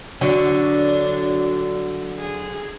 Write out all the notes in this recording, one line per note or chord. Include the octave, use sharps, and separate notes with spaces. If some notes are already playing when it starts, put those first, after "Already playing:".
D3 F#3 D4
G#4